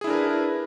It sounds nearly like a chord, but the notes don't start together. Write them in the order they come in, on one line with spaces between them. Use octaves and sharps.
G#4 E4 D4 A#4 B4